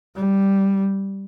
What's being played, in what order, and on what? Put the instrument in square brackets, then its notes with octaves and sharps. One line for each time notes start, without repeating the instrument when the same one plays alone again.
[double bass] G3